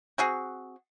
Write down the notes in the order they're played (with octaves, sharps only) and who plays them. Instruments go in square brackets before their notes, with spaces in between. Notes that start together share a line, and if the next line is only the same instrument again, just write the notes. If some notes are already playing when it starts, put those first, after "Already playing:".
[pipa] C4 F#4 G#4